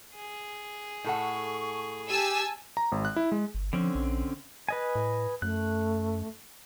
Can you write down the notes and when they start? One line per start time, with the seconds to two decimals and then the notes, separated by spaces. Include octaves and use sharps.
0.15 G#4
1.04 A2 A4 F#5 C#6
2.09 G4 G#5 A5 E6
2.77 A#5
2.92 G#1
3.05 F#6
3.16 E4
3.32 G#3
3.54 G1
3.73 D3 F3 C4 C#4
3.95 A#1
4.69 B4 D#5 G#5
4.95 A2
5.42 F#2 A3 F#6